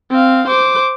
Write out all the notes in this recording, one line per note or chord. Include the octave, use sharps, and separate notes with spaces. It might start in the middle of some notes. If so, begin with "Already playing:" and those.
C4 F5
C5 D6